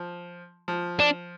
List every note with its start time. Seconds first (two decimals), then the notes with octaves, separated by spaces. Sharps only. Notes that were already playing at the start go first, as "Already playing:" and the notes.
Already playing: F3
0.68 F3
1.00 D4